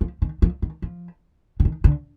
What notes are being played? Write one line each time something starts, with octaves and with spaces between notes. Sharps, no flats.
F3
D#3
F3
D#3
F3
D3
D#3
D3